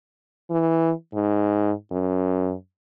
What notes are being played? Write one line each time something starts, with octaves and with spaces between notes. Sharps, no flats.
E3
G#2
F#2